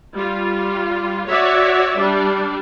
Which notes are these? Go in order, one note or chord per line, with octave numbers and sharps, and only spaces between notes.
G3 F4
F#4 C#5 D5 E5
G3 D4